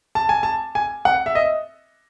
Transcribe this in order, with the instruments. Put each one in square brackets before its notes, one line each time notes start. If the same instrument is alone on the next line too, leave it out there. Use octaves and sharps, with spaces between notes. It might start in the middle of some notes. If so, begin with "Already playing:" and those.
[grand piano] A5
G#5
A5
G#5
F#5
E5
D#5